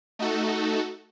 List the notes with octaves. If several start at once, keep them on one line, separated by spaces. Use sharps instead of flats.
A3 D#4 F#4 A4